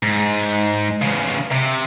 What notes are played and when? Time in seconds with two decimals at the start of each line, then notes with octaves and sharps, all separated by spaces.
0.03 G#2
1.02 E2 C#3
1.52 C3